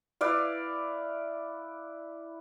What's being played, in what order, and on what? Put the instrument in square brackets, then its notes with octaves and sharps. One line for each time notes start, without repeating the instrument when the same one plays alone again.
[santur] E4 B4 D5 F5